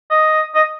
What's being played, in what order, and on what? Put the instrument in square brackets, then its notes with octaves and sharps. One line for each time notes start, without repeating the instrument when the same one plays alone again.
[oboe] D#5
D#5